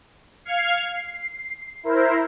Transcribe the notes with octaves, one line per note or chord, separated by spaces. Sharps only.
F5 F6 G#6 C7 C#7
C7
E4 A#4 C5